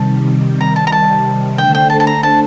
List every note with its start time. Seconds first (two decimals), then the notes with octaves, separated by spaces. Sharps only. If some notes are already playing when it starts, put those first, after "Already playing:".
Already playing: C3 D#3 G3 A5
0.61 A#5
0.76 A5
0.87 A#5
0.92 A5
1.57 D3 A3 D4 A4 C5 G5
1.75 G5
1.90 A5
2.00 A5
2.07 A#5
2.23 A5